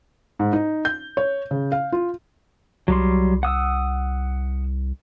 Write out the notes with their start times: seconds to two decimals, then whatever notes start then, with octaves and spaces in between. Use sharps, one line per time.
0.39 G#2
0.53 D#4
0.85 G6
1.17 C#5
1.51 C#3
1.72 F5
1.92 F4
2.88 C2 F#3 G3 C6
3.43 F#5 D#6 E6